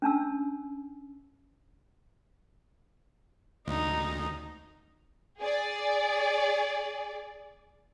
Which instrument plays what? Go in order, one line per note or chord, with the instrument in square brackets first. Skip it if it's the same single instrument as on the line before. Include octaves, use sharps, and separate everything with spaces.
[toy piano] C#4 D4 A5 E6
[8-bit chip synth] D2 [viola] D#4
[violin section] G#4 D5